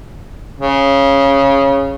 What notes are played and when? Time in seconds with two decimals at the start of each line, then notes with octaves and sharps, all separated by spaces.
0.59 C#3